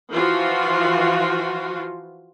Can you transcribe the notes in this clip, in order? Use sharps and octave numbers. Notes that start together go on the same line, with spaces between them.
E3 F3 F4 F#4